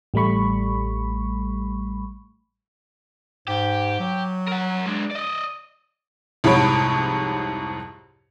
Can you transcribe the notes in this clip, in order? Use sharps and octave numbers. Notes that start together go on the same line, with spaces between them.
A1 G3 A3 B5 C#6
G#2 G4
F#3
A#4 F#5
G#3 D4
D5 D#5
C2 F2 G#2 C#5 B5 D7